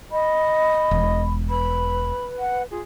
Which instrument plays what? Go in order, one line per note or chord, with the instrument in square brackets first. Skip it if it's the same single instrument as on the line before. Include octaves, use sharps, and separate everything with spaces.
[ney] D#5 [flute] B5
[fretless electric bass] E1
[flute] B4 [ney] B5
[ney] F#5
[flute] F4 [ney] G#4